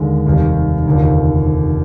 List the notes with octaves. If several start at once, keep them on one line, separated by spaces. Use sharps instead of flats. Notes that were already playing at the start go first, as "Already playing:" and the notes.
Already playing: D#2 D3 G#3
F1 D#2 D#3 G3
F1 D#2 D3 F3